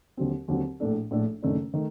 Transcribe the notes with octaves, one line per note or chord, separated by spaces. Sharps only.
D#2 D3 F#3 C4
D#2 D3 F#3 C4
A#1 A2 A3 D4 A4
A#1 A2 A3 D4 A4
F#1 F#2 D#3 A3 D4
D#3 A3